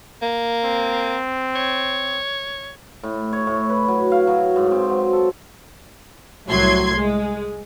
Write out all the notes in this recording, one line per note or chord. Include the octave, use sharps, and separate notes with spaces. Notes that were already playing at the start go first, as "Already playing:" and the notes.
A#3
C4
C#5
A2
C#5
A2
B4
F#3
F5
F#3
G#2
C4
F#3
A4
C2 A2 F#3 C6 G#6
G#3